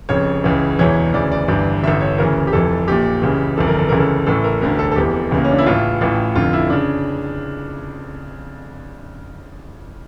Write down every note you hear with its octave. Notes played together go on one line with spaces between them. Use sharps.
F1 F2 C#3 C#5
C#2 C#3 E3
E1 E2 E3 C#5
D2 C#3 E3 D5
D5
G1 G2 E3 D5
A1 G2 D3 E5
C#5
D2 C#3 E3 A#4
G4
F1 F2 E3 A4
A#1 A#2 G4
C#2 C#3 E3
G1 F2 E3 A4
A#4
A4
C#2 C#3 E3 A#4
A4
A1 A2 E3 A4
A#4
E1 D2 D3 A#4
A4
A4
F1 E2 E3 G4
C#2 C#3 E3
A#3
C#4
D4
E4
A1 A2 E3 F4
A1 A2 E3
F1 F2 D3 F4
E4
C#3 D4